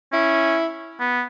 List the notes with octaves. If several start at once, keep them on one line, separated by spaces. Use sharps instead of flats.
C#4 E4
B3